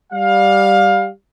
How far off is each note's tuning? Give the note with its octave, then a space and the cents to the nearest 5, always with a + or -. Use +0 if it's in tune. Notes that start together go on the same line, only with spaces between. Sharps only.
G3 +0 F5 +20